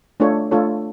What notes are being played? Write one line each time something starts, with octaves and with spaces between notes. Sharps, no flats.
A3 D4 F4 A4 C#5
A3 D4 F4 A4 C#5